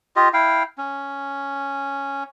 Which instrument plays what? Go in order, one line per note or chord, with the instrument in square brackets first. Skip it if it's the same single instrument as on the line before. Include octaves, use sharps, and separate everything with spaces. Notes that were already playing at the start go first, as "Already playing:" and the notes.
[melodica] F4 G4 D#5
E4 F5 G5
C#4